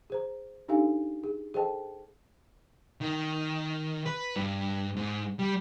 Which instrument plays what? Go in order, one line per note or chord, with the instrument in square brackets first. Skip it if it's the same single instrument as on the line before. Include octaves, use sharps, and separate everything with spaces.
[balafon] G#4 C5 A#5
D4 D#4 G4 A4 F5 G#5
G#4
G#4 A4 C5 D#5 G5 A5
[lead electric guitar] D#3
B4
G2
G#2
G3